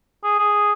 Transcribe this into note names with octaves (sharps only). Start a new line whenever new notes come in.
G#4
G#4